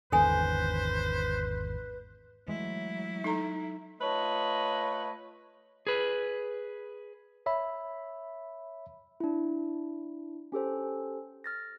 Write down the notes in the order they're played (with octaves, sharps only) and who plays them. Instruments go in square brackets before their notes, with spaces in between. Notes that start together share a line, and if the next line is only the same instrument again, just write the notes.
[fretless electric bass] G#1 E2 D3 [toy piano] A4 G#5 [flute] B4 [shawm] C5
[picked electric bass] E3 G#3 A3 [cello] F#3 E4
[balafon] D#4 A4 A#5
[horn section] A3 F4 B4 C#5 D#5
[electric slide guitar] G#4 B4
[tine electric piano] C#5 E5 B5
[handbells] D4 E4
C#4 G4 A4 C5
F6 A6 A#6